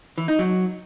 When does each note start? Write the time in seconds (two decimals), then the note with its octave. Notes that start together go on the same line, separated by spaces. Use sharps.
0.18 E3
0.28 D#4
0.39 F#3